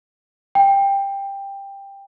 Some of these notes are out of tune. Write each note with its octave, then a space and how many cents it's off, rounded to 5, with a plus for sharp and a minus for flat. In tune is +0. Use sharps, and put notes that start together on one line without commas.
G5 +15